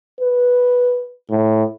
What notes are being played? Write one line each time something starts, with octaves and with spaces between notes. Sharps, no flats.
B4
A2